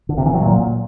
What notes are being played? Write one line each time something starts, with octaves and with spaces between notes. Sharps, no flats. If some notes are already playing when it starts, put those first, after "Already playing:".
D3
C3
E3
F#3
A#2